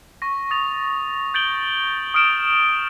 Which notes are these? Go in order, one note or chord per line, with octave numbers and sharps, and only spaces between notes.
C#6 A#6
D#6 A6 F7
G6 A6 D7 F#7 G7
D#6 F6 D7 E7 G7